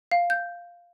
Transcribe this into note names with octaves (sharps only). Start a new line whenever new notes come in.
F5
G6